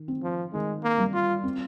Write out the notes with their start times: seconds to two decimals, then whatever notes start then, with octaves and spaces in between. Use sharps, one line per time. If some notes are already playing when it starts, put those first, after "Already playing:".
Already playing: D#3
0.08 C4
0.23 F3
0.53 D#3 G#3
0.83 A#3
0.98 G3
1.14 F4
1.44 C4